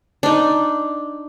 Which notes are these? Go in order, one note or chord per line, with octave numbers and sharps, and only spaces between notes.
D4 D#4